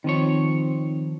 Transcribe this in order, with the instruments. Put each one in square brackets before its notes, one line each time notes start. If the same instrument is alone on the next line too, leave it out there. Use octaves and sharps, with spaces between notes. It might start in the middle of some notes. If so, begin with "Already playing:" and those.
[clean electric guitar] D#3 F3 C#5 [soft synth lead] C4